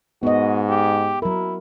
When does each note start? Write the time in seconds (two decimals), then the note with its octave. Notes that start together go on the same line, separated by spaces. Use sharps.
0.23 G#2 B3 F#4 D#5
0.69 G4
1.22 F#3 E4 A#4